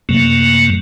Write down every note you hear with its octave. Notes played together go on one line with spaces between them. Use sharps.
F#2 C3 F#3 A3 A#3